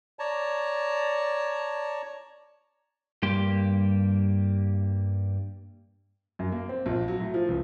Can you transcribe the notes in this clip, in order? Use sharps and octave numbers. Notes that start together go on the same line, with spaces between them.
C#5 D5 A5 A#5
G2 G3 A#3 G4 C6
F#2
A#3
C4
A#1
F#3
A2
F3
C#2